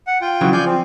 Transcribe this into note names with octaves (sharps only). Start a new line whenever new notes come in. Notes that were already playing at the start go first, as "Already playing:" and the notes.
F#5
F4 G5
C#3 E3 F#3
F3 D5 G#5 G6
C4